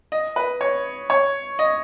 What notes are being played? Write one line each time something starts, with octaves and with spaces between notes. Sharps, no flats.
D#5
B4
C#5
C#5
D#5